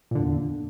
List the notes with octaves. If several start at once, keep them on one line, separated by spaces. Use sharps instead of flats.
E2 A#2 D3